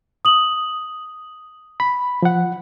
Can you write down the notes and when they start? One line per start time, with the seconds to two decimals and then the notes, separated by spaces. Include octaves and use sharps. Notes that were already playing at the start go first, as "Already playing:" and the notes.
0.25 D#6 F#7
1.80 B5
2.22 F3 F#5